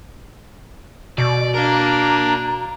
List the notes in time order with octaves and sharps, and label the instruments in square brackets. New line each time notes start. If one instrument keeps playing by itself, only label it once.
[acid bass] B2 [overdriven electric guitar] D5
[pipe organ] D4 [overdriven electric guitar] A#4 F5 [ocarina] A#5